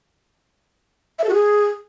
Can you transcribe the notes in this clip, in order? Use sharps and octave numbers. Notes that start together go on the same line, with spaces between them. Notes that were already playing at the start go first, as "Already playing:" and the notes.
E5
A4
F#4
G#4